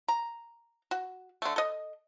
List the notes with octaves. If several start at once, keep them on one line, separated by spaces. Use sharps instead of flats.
A#5
F#4
D3 A3
A4 D#5